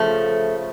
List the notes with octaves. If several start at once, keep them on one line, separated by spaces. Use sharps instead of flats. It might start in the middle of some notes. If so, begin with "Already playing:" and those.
Already playing: C#3 F3 A3